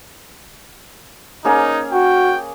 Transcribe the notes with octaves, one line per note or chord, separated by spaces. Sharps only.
A#3 C#4 D#4 G#4
F#4 G5